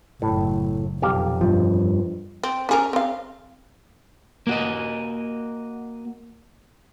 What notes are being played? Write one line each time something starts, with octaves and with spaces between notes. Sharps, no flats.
F#1 F#2 A2
B1 F2 A#2 G4 F5
G2 F3
C4
C#4 G#4 A#4
C4 F5
A#3 F#4 D#5